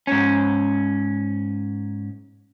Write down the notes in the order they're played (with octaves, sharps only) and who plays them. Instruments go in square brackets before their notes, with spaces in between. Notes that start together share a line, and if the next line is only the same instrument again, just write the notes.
[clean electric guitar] G#2 C#4